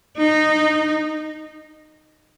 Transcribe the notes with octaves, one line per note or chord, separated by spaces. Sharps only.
D#4